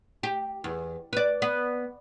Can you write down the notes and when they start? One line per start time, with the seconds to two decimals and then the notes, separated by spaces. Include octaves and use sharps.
0.23 G4
0.64 E2
1.13 B4 D5
1.42 B3